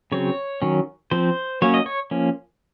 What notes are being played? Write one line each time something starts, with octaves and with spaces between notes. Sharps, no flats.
C#3 F#3 C4 C#5
D#3 F#3 C#4
F3 C4 C5
F#3 A#3 C#4 C#5
D#5
C#5
F3 A#3 C#4